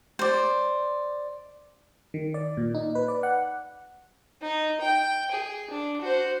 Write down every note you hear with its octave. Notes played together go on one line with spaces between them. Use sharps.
C5 D5
D#3
D5
A#2
D#4
B4
D5
F#5
D#4
G5
G#4
D4
F#4 C5